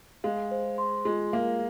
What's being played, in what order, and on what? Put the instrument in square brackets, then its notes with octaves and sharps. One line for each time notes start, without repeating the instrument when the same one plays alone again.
[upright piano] G#3 [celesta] F5
[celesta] C5
C6
[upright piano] G#3 [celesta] F4
[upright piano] A#3 [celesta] F5